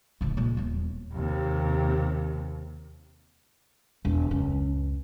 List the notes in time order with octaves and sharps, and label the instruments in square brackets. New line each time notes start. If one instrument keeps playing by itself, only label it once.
[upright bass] D1 C#2
A#2 G#3
D#1 E2
[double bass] D#2 C3
[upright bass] E1 G#3
C#2 F#2